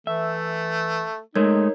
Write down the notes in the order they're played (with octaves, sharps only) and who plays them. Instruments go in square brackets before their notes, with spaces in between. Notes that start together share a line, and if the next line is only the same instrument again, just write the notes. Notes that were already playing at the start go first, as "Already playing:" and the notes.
[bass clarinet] E3 [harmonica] A3 [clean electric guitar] E5
[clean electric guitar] G#3 A3 [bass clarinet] D#4 [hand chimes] A#4 C#5 G#6